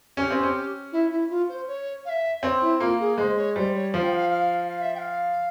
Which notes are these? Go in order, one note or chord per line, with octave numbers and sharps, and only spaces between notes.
C#4 G4
C4
C#4
E4
E4
F4
C5
C#5
F5
E5
C4 C#5
E4
A#3 F4
G#4
G#3 C5
C#5
G3 C5
C#5
F3 F5
G5
F5
F5
F5
E5
G5
F5